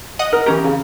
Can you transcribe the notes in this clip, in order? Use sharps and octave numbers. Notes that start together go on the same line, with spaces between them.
D#5 F#5 D#6
A#4
E3 C#4 G4 A#5
C#3